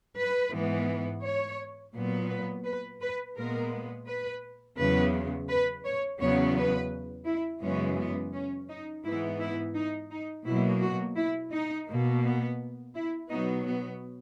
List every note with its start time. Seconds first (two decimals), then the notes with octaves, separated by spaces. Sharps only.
0.17 B4
0.53 G#2 E3 B3
1.23 C#5
1.94 A#2 F#3 B3
2.30 B4
2.66 B4
3.02 B4
3.37 A#2 G#3 B3 A#4
4.07 B4
4.78 E2 C#3 F#3 B3 B4
5.49 B4
5.85 C#5
6.20 E2 C#3 F#3 B3 C#5
6.57 B4
7.27 E4
7.62 F#2 C#3 E3 G#3 B3 C#4
7.99 B3
8.33 C#4
8.69 D#4
9.05 G#2 E3 B3 E4
9.40 E4
9.75 D#4
10.11 D#4
10.46 B2 F#3 A#3 E4
10.82 F#4
11.17 E4
11.52 D#4
11.88 B2 A#3
12.24 B3
12.95 E4
13.30 B2 F#3 B3 D#4
13.65 B3